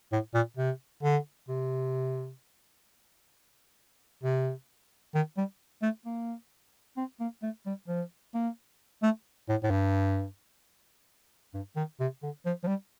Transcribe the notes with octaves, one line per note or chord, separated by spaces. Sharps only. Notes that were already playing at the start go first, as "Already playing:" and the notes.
A2
A#2
C3
D3
C3
C3
D#3
G3
A3
A#3
C4
A#3
A3
G3
F3
A#3
A3
A2
A2
G2
G2
D#3
C3
D3
F3
F3
G3